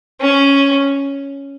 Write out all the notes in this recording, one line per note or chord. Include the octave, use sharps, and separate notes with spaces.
C#4